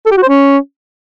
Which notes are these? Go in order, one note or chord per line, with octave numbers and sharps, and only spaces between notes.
A4
G4
F#4
C5
C#4